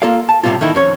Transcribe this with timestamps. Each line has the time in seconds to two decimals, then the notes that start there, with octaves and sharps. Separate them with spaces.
0.02 A#3 F4 A4 D5 F5
0.29 A5
0.44 A2 C3 D#3 G3 C4 F4
0.61 D#3 E3 A3 D#4 E4
0.75 F2 C#4 C#5